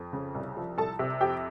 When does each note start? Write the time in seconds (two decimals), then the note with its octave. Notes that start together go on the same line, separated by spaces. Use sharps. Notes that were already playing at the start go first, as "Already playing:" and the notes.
Already playing: F2
0.13 C#3
0.35 C2
0.57 F3
0.78 C2 A4 A5
0.99 C3
1.21 F2 G4 G5